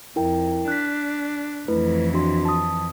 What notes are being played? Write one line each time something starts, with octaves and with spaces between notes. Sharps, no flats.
F2 E4 A#4 G5
D4 F#6 B6
F2 E3 A3 E4 B4
D4 F#4 C6
A5 D#6